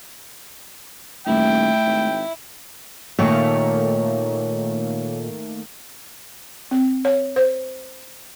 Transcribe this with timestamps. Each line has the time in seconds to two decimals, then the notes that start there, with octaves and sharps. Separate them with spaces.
1.26 D#1 A3 E4 G5
1.86 G#1
3.19 A#2 D#3 A3 A#3 C#5
6.71 C4
7.05 C#5
7.36 C5